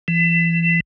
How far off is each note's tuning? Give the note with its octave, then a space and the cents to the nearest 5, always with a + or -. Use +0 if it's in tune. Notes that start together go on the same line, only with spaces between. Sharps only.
E3 +30